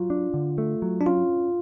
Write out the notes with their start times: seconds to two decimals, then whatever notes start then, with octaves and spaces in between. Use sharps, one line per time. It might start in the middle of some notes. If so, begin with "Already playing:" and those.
Already playing: F#3 F4
0.10 D4
0.34 D3
0.58 A3
0.82 F#3
1.01 D4
1.06 C#4 F4